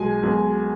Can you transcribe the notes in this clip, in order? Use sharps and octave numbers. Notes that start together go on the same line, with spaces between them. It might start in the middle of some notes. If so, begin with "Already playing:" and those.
Already playing: B1 B2 G#3 G#5
B1 B2 G#3